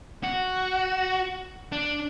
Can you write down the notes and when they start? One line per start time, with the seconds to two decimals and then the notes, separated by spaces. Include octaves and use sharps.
0.23 F#4
1.72 D4